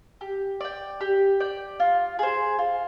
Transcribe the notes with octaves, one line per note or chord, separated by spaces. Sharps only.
G4
D5 G5
G4
D5 G5
F4
G#4 C5
F4